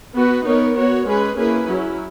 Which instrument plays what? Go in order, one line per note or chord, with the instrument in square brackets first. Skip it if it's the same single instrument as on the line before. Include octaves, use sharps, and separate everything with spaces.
[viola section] B3 F#4 B4
B3 D#4 A#4 C#5
B3 F#4 C#5
G#3 C#4 G#4 B4
A#3 C#4 E4 G#4 B4
F#3 C#4 E4